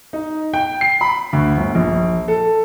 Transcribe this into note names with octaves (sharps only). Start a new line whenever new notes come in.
D#4
G5
C7
B5
D2
G1
A#1
A4